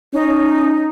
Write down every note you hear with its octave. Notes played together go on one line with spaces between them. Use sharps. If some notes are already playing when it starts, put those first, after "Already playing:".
C#4 D#4